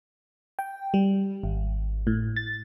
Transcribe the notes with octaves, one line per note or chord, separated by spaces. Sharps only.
G5
G3
G#1
A2
A6